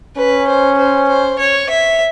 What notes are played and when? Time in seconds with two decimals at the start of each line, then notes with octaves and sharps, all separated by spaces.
0.17 C#4 B4
0.47 C5
0.78 C5
1.08 C5
1.39 C#5
1.69 E5